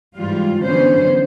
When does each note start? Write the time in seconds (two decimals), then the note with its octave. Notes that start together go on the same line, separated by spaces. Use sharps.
0.17 G#2 E3 G3 F4
0.63 D3 E3 F#3 B3 C#4 C5